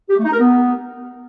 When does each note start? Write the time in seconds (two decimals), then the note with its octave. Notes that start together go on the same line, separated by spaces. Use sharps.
0.09 G4
0.17 A3
0.24 D#4
0.32 A#4
0.40 B3